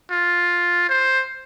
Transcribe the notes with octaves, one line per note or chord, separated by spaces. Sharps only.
F4
C5